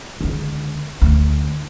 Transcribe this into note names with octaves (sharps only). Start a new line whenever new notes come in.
C#2 D3
D2